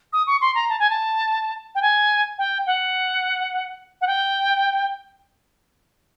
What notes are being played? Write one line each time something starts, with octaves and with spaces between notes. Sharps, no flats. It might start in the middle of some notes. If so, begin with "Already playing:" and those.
D#6
C#6
C6
A#5
A5
G#5
A5
G5
G#5
G5
F#5
F#5
G5